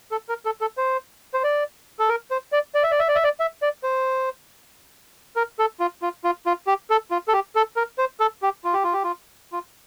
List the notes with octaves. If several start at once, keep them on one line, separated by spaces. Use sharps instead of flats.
A4
A#4
A4
A4
C5
C5
D5
A4
A#4
C5
D5
D5
E5
D5
E5
D5
E5
D5
E5
D5
C5
A#4
A4
F4
F4
F4
F4
G4
A4
F4
A4
G4
A4
A#4
C5
A4
G4
F4
G4
F4
G4
F4
F4